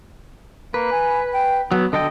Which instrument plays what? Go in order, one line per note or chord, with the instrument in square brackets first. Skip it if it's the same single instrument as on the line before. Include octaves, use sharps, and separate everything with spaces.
[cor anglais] A#3 [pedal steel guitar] B4
[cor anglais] G#5
G5
[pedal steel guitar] F#3 [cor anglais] B3
[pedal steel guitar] D3 A4 G5 [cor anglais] D#5